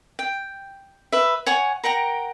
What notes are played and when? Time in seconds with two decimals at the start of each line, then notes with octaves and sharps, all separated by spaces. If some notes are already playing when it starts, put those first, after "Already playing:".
0.19 G5
1.12 B4 E5
1.46 C#5 F#5 G#5 C#6
1.84 A#4 F#5 G5 A#5